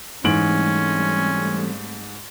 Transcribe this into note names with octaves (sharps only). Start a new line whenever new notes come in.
G#2 E3 G3 A3 C4 C#4 D7 F#7